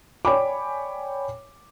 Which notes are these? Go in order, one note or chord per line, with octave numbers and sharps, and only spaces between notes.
C#5 D5 G5 G#5 B5 D6